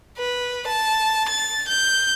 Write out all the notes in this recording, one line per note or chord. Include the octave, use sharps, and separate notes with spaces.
B4
A5
A6
G6